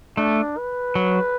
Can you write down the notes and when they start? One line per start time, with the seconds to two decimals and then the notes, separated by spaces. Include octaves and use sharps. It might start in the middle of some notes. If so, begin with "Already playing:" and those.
0.17 A3 D4
0.57 B4
0.95 F#3